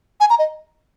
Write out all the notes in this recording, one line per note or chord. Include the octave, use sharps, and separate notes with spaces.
G#5
A#5
D#5